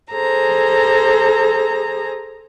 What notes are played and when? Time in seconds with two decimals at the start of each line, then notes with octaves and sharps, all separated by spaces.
0.11 G#4 A4 C5 A#5